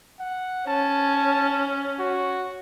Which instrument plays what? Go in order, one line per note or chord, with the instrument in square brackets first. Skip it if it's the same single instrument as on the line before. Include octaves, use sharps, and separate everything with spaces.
[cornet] F#5
[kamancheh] C#4 [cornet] A5
[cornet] F#4